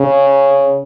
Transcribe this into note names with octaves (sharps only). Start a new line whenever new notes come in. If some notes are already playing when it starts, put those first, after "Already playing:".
Already playing: C#3